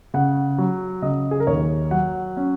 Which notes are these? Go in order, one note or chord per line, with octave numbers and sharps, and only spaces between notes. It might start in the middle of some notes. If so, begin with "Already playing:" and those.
C#3 F#5
F#3
C#3 D#5
G#4
A#4
D#2 C#5
F#3 F#5
C#4